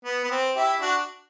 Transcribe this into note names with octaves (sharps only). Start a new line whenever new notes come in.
B3
B3
C4
E4 G4
D4 F#4